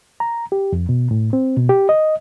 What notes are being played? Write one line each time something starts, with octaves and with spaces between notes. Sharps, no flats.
A#5
G4
F2
B2
A2
C4
B2
G4
D#5